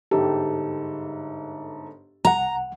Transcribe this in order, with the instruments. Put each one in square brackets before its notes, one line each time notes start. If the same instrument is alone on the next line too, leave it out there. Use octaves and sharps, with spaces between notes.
[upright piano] G1 G#2 A4 [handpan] G4
[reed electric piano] C2 F#5 [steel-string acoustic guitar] A#5